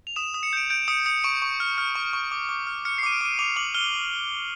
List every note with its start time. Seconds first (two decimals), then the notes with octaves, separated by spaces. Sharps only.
0.07 F7
0.16 D#6 E7
0.34 D#6
0.43 C#7
0.53 G6 D7
0.70 G6 D7
0.88 D#6 C#7
1.06 D#6 C#7
1.24 C#6 D7
1.42 C#6
1.60 F6
1.78 F6
1.95 C#6
2.13 C#6
2.31 D6
2.49 D6
2.67 F6
2.85 F6 C#7
2.98 C7
3.03 D6 D#7
3.12 D7
3.21 D6 D#7
3.39 D6 F7
3.56 D6 F#7
3.74 F6 G7